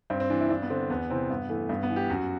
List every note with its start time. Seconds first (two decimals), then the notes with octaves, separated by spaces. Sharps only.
0.10 G2 C4
0.20 C4
0.30 E3 D4
0.40 E4
0.50 G2 D4
0.62 B3
0.70 D3 C4
0.90 E2 B3
1.10 C3 E3 C4
1.30 G2 B3
1.49 E3 A3
1.69 G2 B3
1.83 B3
1.90 E3
1.96 G4
2.10 F#2 F#4